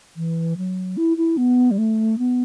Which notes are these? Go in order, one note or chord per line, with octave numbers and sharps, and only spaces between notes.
E3
F#3
E4
E4
B3
G3
A3
B3